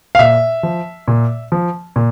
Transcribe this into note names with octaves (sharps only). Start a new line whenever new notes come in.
F5
A#2 E5
F3
A#2
F3
A#2